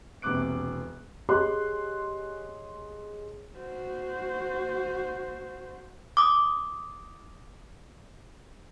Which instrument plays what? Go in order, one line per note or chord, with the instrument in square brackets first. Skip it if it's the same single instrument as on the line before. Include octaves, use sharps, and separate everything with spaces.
[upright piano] E1 A#1 C3 D6 F#6 D7
[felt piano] G4 G#4 C#5 D#5 C6 F#6
[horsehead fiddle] F#4 C5
[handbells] D6 D#6